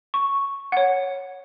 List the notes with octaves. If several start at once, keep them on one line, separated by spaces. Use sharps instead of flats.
C#6
C#5 F#5